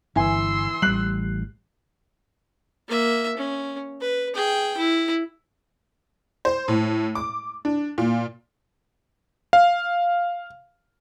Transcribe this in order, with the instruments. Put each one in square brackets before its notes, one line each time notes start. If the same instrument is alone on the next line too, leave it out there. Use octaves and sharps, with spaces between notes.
[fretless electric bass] G1 [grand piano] E3 G#5 [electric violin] C6 E6
[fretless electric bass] A1 G3 [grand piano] F#6 C7 F#7
[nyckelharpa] A#3 E5
C#4
B4
G#4 G5
E4
[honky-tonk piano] C5
A2
D6
D4
A#2
[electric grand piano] F5